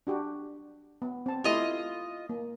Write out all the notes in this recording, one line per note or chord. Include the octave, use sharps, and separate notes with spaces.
D4 F#4 G4
B3
C4 A5
A3 E4 F4 G4 D#5
A#3